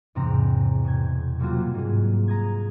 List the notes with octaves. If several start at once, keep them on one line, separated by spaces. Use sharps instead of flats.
E2 G#2 C3 C4 A#5
B2 G6 G#6
F#3 G3 A#3 C4 F4 F#4
G#2 G#4
A#5 D#6 G#6